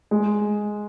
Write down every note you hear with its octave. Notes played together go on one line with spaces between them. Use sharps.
G#3